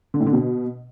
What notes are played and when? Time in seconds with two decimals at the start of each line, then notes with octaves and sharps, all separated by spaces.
0.14 D3
0.20 A2
0.26 D3
0.33 B2